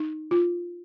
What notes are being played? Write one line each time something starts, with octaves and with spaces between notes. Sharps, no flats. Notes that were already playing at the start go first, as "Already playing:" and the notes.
Already playing: D#4
F4